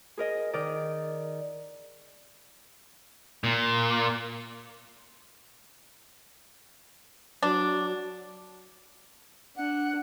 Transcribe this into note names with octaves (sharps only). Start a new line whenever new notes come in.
G#4 A#4 D#5
D#3 A#4 D5 D#5
A#2
F#3 D4
D4 F#5